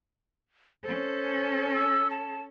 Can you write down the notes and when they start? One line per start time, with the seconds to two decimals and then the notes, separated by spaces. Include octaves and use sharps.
0.84 C#4 A4 C5
1.75 E6
2.11 A5